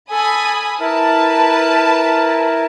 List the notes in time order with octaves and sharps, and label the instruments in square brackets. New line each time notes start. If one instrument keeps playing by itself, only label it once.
[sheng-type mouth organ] A4 [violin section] G#5 B5 D#6
[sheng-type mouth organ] E4 A#4 [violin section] B4 A5